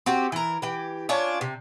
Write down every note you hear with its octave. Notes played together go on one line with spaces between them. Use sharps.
C4 F#4 G4
E3 A#4
E3 G4
C#4 D4 F4 C#5
C3